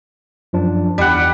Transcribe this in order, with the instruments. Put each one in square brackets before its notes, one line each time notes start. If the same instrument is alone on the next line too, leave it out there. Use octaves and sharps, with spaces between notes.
[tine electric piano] F#2 F3 D4
[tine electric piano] E2 [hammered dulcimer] G3 F#5